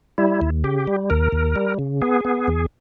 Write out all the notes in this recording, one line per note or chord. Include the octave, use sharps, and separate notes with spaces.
G3 E4
D#2
C#3 G4
G3
D#2 A#4
D#2
G3
C#3
B3 G#4
B3
E2